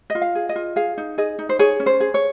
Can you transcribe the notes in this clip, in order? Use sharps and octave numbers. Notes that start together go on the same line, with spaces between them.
D#5
F4
F5
G#4
D#5
F4
G#4 F5
D#4
G#4 D#5
D#4
C5
G#4 C#5
C#4
C5
G#4
C#5